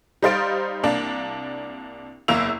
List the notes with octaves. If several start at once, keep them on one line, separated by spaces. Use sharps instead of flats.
G3 D#4 C5 F5 A6 D7
C2 A#3 D4
F#1 E2 A#3 E4 E6 F7